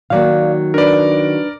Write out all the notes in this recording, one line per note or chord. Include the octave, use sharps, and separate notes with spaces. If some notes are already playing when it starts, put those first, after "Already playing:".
D#3 F#3 A#3 D5 F5
D4 A#4 B4 D5